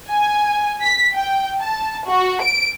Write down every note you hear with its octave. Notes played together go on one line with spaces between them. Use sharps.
G#5
B6
G5
A5
F#4
D7